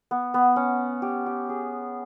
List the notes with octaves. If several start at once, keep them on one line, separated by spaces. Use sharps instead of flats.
B3
B3
C#4
G4
G4
G#4